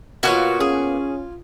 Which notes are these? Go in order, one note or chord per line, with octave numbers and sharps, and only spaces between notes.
B2 A#3 B3 F4 F#4 C#5 G#5
C#4 G#4